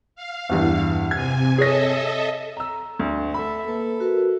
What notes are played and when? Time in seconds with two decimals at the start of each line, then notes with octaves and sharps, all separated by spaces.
0.16 F5
0.49 E2 G2 E3
1.11 C3 G#5 G#6
1.58 G#4 A4 C#5 D#5 E5 A#6
2.57 A#5 E6
2.99 D2
3.34 A4 E5 B5
3.66 A#3 A4 B4
4.00 F#4 A#4 B4